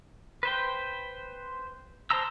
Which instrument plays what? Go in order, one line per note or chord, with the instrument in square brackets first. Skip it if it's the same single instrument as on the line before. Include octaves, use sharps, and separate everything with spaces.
[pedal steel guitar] B4 C5 G5
C5 A5 A#5 E6